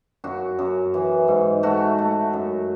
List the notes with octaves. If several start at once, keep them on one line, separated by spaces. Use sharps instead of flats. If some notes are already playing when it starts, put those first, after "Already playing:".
F#2 F#4
F#2
E3
G#2
A3 F#4
A3
F#2